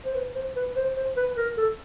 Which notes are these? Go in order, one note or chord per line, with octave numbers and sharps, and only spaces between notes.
C5
B4
C5
B4
C5
C5
B4
A#4
A4